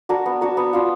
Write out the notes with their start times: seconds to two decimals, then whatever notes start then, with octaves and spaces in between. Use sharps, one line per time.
0.09 D4 F#4 A#4
0.26 B3
0.41 D4 F#4 A#4
0.57 B3
0.73 D4 F4